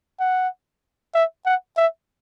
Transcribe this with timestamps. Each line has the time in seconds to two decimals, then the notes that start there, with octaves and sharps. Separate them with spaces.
0.20 F#5
1.15 E5
1.46 F#5
1.77 E5